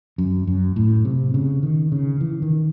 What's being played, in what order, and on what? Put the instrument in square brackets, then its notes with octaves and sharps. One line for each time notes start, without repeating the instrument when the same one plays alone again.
[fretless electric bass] F#2
F#2
A2
C3
C#3
D#3
C#3
E3
D#3